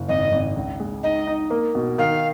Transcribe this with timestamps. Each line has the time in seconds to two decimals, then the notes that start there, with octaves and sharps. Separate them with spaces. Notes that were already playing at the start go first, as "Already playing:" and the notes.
Already playing: F#1
0.08 G#1 D#5
0.32 G#1
0.56 C#2
0.80 G#3
1.03 D#4 D#5
1.27 D#4
1.50 A#3
1.75 B2
1.98 D#3 F5